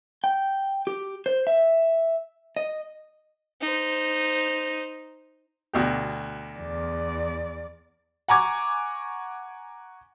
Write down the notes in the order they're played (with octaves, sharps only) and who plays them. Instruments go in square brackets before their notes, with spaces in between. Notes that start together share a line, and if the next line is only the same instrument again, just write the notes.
[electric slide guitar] G5
G4
C5
E5
D#5
[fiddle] D#4 C5
[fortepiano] D2 B2 G4
[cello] E2 D5
[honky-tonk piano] F#5 G#5 A#5 C#6 D6 G#6